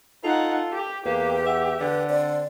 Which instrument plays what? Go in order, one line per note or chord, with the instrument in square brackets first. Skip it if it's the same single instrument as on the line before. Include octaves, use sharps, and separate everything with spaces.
[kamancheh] D#4 F#5 [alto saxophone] F4 [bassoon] A4
[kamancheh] G4
[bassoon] E2 [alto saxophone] A#3 [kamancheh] G4 [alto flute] B4
[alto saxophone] E5 [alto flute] F#5
[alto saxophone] D3 [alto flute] B4
[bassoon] C4 [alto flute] D5